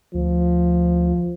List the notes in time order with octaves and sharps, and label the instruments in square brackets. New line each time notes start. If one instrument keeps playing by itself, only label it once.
[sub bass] D2 [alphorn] F3